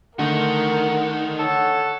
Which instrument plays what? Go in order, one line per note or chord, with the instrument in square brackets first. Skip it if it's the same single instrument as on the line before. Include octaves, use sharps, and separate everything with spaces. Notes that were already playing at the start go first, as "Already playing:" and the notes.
[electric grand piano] D3 A3 [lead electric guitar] D#3 [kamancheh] A#4 [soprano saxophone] F#5
[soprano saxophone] A4 [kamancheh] C#5 F#5